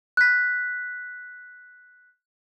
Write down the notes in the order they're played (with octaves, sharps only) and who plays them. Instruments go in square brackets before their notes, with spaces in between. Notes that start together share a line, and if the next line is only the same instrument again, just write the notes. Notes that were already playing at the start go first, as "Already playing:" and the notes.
[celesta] F#6 B6